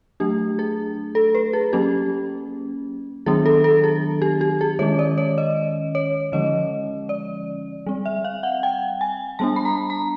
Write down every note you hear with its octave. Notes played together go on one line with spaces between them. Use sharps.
F#3 A3 D4 G4
G#4
A4
B4
G#4
F#3 A#3 C#4 G4
D#3 F#3 B3 D4 G#4
A4
A4
G#4
G4
G4
G#4
D#3 G#3 C#4 C#5
D5
C#5
D#5
C#5
D3 F3 G#3 C#4 D#5
D5
G3 C4
E5
F5
F#5
G5
G#5
G3 B3 D4 A5
B5
A#5
A#5